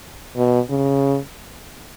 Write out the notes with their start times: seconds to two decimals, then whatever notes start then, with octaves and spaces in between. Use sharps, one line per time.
0.37 B2
0.70 C#3